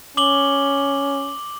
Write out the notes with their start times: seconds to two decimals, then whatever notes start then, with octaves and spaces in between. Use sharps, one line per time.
0.17 C#4 D6 F#7 G7